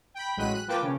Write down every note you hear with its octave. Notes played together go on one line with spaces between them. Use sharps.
G5 B5
A1 F#3 G#3 F#6 B6 D#7
F#6
F3 A#3 B4 G5 A5 D6
C#3 C#4